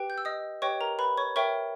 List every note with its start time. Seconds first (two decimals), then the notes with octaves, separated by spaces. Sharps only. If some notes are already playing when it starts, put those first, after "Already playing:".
Already playing: G4 B4 G5
0.10 G6
0.18 E6
0.25 D#5 D#6
0.62 G4 B4 C#5 D#5 G5 C#6
0.81 A#4 A#5
0.99 B4 B5
1.17 C#5 C#6
1.36 A#4 C#5 E5 G5 C#6